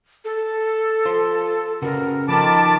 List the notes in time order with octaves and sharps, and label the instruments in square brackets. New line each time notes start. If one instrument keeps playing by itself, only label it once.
[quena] A4
[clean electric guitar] F4 C5
[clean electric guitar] C#3 F#4 B4 [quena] A#4
[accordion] D#3 A5 D6 [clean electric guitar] F3 A4 [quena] B5